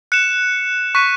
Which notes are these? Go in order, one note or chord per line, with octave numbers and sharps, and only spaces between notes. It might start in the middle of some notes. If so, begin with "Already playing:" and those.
F#6 C#7 E7
C#6 F#6 B6 D#7